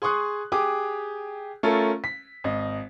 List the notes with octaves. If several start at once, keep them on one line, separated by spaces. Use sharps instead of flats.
G#4 C6 C#6 D#6 F#6
G4 G#4 D6 D#6
A3 C#4 F4 A4 A#4
B6
G#1 D#5